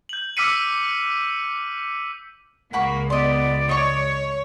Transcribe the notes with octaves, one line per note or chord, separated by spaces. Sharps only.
G6 F#7
D6 E6 F6 B6 C#7 D#7
C#2 A#3 F#5 B5 C#6
B3 D5 D#5 C6
C#5 D#5 C#6